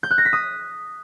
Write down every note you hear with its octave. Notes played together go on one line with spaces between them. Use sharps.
G6
F#6
A#6
B6
D#6